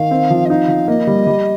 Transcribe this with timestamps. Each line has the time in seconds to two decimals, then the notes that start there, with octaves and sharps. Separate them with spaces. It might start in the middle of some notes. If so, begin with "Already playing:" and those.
Already playing: D#3 F5
0.11 C4
0.30 F3
0.45 D#5
0.49 D#4 F5
0.68 F3
0.88 A#3 D#5
1.07 G3
1.27 G3